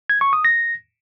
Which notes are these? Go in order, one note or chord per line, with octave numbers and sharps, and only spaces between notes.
G#6
C#6
D#6
A#6